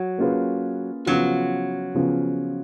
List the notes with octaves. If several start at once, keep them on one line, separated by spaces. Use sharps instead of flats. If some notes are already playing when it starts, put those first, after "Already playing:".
Already playing: F#3
A#3 C#4 F4 G#4 B4
C#3 F3 F#3 B3 F4
C#3 F3 B3 F4